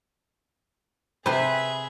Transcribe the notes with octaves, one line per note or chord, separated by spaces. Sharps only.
C3 G#4 B4 C5 E5